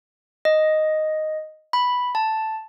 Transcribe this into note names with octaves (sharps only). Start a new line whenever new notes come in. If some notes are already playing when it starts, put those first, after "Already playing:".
D#5
B5
A5